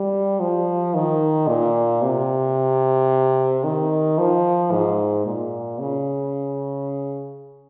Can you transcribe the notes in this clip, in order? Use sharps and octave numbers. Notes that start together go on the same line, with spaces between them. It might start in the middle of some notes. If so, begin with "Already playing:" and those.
Already playing: G3
F3
D#3
A#2
C3
D#3
F3
G#2
A#2
C#3